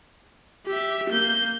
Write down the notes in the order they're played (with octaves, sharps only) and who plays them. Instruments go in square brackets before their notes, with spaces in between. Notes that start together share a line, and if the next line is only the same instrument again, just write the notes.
[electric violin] G4 E5
A#3 G6